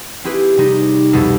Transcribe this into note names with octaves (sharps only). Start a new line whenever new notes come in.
C4 E4 G4 G#4 B4
C3 G3 D#4
C2 F2 B2 G3 G#4 A4